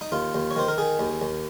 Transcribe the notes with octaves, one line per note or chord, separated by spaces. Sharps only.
D#4
D#2 F4
D#2
C#5
D#3 C5
A#4
D#3 G#4
D#2
D#2